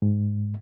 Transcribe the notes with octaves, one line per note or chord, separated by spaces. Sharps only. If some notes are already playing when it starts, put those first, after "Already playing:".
G#2